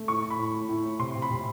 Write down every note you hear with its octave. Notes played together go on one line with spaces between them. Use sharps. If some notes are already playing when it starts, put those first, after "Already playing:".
Already playing: A3
A2 C#6
A2
B5
A2
A2
A2
A2
C3 C6
C3
B5
C3